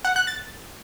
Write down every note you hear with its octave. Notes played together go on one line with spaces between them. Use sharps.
F#5
F#6
A6